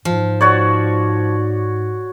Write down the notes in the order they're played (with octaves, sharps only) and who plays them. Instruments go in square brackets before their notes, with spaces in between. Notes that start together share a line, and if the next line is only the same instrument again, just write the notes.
[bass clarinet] G#2 [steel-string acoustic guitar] F3
[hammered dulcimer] F#4 C#5 D5